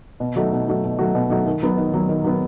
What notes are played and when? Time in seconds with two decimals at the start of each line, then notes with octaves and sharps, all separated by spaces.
0.20 B2
0.36 F#3 A3 D#4 F#4
0.52 B2
0.68 F#3 A3 D#4 F#4
0.84 B2
0.99 F#3 A3 D#4 F#4
1.15 B2
1.30 F#3 A3 D#4 F#4
1.46 D#3
1.63 F#3 B3
1.77 D#3
1.94 F#3 B3
2.09 D#3
2.24 F#3 B3